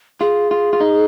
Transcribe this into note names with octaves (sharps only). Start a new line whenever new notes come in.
F4 G#4
F4
F4
D#4